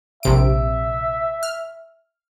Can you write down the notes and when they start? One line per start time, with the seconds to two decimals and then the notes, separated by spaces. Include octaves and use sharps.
0.23 A#1 C3 E5 D7
1.43 F6